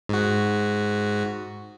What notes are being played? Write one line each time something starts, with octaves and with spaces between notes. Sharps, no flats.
G#2 F#4